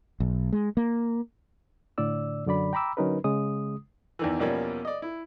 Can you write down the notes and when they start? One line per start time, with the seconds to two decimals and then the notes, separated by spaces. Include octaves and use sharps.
0.20 B1
0.53 G#3
0.77 A#3
1.98 A2 D3 D5 E6
2.46 F#2 D3 F#3 D5 B5
2.73 G5 A#5 B5 D6 E6
2.97 D3 F#3 C#4 D#4 A#4 B4
3.24 C#3 G#3 D#6
4.19 E2 D#3 E3
4.39 E2 B2 F3 G3 A#3 C#4
4.85 D5 D#5
5.02 E4